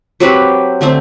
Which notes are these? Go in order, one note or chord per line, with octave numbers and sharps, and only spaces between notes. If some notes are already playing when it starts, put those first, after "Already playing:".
F#3 C4 G4 B4
D3 A3 C4